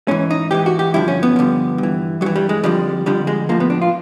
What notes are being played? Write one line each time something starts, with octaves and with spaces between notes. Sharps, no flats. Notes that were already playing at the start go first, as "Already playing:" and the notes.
G#2 E3 C#4
D#4
G#2 E3 G4
F#4
G4
G2 D3 F3 E4
C#4
B3
G2 D3 F3
G2
E3
G2 F#3
E3
G3
G#3
F2 D3 F3 G3
F2 D3 F3 G3
G#3
A2 F3 A#3
B3
D4
F4